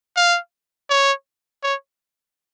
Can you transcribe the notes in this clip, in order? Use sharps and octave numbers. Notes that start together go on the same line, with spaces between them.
F5
C#5
C#5